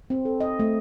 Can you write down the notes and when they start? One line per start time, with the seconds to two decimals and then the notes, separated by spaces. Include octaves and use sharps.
0.10 C4
0.25 A4
0.41 D#5
0.59 A3